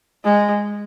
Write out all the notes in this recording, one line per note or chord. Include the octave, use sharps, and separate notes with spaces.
G#3